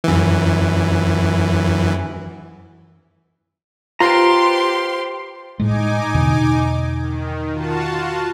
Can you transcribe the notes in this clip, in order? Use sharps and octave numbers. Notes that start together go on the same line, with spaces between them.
F#2 E3
F4 G4 B4 C5 A#5 C6
A2 G#3 D#4 G#5 D6
E2 B2 D3
D#3
F4 F#4 A5